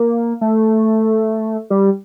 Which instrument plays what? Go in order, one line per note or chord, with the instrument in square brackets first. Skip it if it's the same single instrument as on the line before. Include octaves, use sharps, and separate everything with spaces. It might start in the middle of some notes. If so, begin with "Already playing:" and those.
Already playing: [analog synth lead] A#3
A3
G3